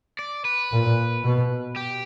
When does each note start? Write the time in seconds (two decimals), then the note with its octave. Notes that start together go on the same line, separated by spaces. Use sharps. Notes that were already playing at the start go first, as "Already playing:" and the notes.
0.19 D5
0.45 B4
0.71 A#2
1.23 B2
1.76 G4